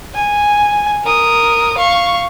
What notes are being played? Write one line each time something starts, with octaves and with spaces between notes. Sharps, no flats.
G#5
A#4 D#6
F5 C#6